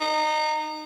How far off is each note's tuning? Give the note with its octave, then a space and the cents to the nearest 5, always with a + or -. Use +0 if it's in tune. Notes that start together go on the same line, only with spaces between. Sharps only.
D#4 -25